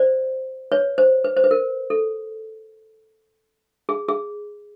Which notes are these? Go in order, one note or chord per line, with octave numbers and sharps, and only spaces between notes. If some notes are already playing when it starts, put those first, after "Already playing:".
Already playing: C5 D5
B4 C#5
C5
B4
C5
B4
A#4
A4
G#4
G#4